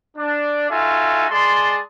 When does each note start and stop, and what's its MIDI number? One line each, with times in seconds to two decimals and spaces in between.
0.17 0.69 62
0.69 1.25 63
0.69 1.25 65
0.69 1.25 66
0.69 1.25 69
0.69 1.25 76
0.69 1.25 80
1.29 1.78 56
1.29 1.78 68
1.29 1.78 74
1.29 1.78 81
1.29 1.78 84